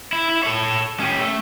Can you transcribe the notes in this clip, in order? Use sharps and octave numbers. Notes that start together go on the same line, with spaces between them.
E4
E4
A4 C#5
C#4 G4
A3